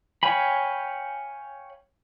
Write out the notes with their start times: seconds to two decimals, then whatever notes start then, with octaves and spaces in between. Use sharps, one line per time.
0.23 C#5 F5 G5 G#5 B5